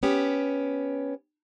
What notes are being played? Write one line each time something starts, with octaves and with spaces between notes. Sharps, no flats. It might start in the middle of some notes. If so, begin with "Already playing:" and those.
B3 C#4 G4